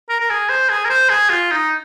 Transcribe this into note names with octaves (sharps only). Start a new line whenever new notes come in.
A#4
A#4
G#4
C5
G#4
A#4
C5
G#4
F4
D#4